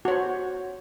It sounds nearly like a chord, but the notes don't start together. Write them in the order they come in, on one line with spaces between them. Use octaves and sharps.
F#4 C#5 C5